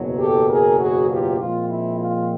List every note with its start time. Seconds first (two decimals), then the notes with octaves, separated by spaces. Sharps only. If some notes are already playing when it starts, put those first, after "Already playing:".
Already playing: F#1 E2 B2 F#3
0.18 G4 A4
0.49 G#4 A#4
0.79 F#4 G#4
1.09 F4 G4
1.39 A#2 F3 G#3 C4 F4
1.70 E4
2.00 F4